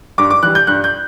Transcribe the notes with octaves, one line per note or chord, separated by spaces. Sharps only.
G2 D6
D6
E3 G3 F#6
G6
G2 F#6
G6